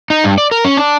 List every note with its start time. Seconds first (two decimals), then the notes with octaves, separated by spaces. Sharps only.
0.10 D#4
0.24 G2
0.38 D5
0.51 A#4
0.65 C#4
0.77 D4